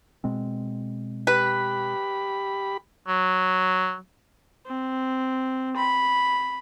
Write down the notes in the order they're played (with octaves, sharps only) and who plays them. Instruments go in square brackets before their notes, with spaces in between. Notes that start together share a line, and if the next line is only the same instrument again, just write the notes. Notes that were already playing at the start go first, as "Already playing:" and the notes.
[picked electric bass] B2 G#3 C4
[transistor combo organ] G4 B5 [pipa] B4
[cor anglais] F#3
[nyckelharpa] C4
B5